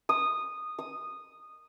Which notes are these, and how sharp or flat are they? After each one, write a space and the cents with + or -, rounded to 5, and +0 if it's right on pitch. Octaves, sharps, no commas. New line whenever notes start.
D#6 -15
D#6 +0